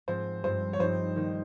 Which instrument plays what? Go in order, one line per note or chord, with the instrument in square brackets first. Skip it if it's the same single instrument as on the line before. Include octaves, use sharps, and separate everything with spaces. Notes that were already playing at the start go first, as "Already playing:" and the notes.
[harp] G#2 F3 C4 [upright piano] C5
[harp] G2 F3 C4 [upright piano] C5
[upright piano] C#5
[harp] G2 F3 C4 D#4 [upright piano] C5
[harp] D#3 A#3 D#4